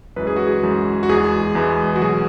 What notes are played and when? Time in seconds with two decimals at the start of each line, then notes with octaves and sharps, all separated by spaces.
0.16 F#2 E3 G#3 B4
0.27 G#4
0.36 F#4
0.47 G#4
0.63 F#2 E3 G#3
1.03 F#4
1.09 E2 E3 G#3 G#4
1.55 E2 E3 G#3
1.95 F#4
2.01 B2 F#3 G#4